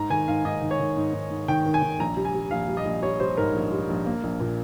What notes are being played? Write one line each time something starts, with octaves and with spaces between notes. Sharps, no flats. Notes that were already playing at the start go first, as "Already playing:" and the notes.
Already playing: G#2 A#5
D#3 G#5
G#2 F5
G#2 D#5
D#3
C#5
D#3
G#2
G#2
G#2
D#3 G5
D#3
G#5
D#3
A#1 A#5
G3
G#5
G3
A#1 F5
G3
D#5
A#1
G3 C#5
G3 C5
G#2 A#4
A#1
G3
A#1
A#3
A#1
A#2